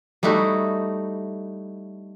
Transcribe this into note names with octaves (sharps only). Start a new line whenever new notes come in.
G3 A3 D#4 E4 F#4